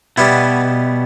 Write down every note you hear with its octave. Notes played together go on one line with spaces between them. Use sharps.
B2 G3 B3 E4